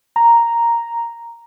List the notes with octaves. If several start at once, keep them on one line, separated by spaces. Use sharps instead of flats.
A#5